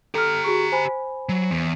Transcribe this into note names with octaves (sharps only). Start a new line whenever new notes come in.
G4 A4 A#5 F6
F#4 G#4 C#6
C5 G#5 B5
F#3
E2